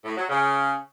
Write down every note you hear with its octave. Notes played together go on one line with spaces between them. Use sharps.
A2
F#3
C#3